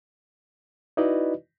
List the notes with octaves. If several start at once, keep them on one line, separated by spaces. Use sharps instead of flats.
D#4 E4 F#4 B4 D5 D#5